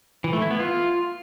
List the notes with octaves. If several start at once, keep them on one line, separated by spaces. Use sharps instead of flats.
E3
A3
E4
B3
F4